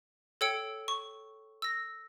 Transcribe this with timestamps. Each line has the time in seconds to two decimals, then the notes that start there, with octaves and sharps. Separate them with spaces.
0.41 A4 C#5 G5 E6 C#7 D7
0.88 C#6
1.62 E6 A#6